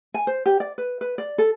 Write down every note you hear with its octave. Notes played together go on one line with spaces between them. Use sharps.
G#5
C5
G4
D5
B4
B4
D5
A4